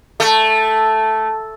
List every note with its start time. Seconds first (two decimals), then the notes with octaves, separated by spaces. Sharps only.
0.20 A3